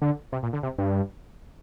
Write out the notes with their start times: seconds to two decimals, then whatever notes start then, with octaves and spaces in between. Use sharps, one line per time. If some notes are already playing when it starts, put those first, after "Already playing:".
0.02 D3
0.32 C3
0.43 A#2
0.53 D3
0.63 C3
0.78 G2